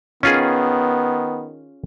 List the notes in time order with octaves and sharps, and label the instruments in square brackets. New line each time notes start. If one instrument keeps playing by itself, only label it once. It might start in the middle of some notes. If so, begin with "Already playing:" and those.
[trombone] D#3 [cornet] B3 [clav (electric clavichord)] C#4 F4 G#4